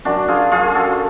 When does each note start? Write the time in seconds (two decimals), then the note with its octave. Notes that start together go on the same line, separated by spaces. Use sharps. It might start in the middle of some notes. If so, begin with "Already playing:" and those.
0.05 F#2 D4 F#4
0.28 F4 G#4
0.51 F#2 F4 G#4
0.66 G#4
0.75 F#4 A4